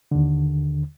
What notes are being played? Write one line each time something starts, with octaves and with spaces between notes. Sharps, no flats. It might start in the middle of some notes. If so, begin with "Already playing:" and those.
D#2 D3